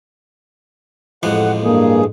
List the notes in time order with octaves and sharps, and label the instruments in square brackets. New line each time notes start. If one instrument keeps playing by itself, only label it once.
[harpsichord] A1 F2 G#3 [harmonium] F#5
[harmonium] G2 G#4 [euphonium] A#3